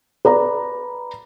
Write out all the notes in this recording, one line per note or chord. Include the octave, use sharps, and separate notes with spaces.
B4 D5 A#5